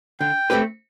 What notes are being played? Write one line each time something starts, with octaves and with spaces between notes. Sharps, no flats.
D3 G5
A3 C4 G4 B4